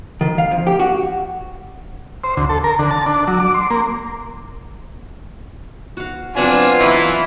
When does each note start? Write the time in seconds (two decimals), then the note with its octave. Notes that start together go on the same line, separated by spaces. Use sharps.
0.21 D#3
0.38 F5
0.51 F2
0.67 G4
0.79 F#4
2.24 C5
2.37 D2
2.49 A4
2.64 A#4
2.79 D3
2.91 A5
3.06 D4
3.27 F#3
3.40 D6
3.54 C6
3.70 A#3
5.97 F#4 F5
6.37 F#3 B3 C4 D4 F4 G#5
6.80 E3 E4 C#5 D#5 A#5